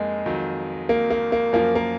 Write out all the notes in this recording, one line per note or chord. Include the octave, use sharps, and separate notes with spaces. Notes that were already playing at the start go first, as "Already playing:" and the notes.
Already playing: F2 G#3 A#3 D#4
F2 D#3 F#3
A#3
A#3
A#3
F#2 F3 A#3
A#3